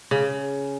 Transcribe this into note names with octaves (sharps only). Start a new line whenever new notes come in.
C#3